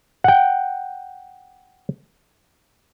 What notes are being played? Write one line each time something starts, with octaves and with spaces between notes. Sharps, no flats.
F#5 G5